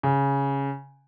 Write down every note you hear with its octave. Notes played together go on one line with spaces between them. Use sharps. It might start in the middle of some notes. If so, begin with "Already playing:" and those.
C#3